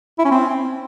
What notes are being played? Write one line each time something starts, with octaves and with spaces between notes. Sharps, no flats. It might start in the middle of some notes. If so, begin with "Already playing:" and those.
E4
C#4
C4